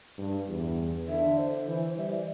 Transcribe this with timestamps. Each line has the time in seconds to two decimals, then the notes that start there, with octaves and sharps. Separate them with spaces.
0.18 G2
0.48 E2
1.08 D3 E5
1.38 C5
1.67 E3
1.97 G3 E5
2.13 D5